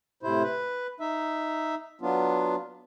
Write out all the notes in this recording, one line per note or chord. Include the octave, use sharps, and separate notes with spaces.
A2 C3 E4 C5
B4
D#4 E5
F#3 B3 D4 F4